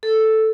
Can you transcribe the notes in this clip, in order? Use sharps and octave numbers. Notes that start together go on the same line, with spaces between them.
A4